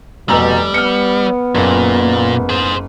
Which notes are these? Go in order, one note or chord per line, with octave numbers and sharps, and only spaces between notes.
F1 B2 G3 A#5 E6
B3 F6 C#7
F#1 A#2
G#4 C5